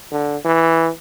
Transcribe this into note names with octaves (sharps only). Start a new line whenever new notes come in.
D3
E3